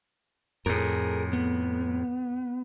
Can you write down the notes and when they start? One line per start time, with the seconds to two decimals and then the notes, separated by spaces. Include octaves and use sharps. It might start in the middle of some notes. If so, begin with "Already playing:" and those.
0.66 F2 A2 G#4 A#4
1.33 B3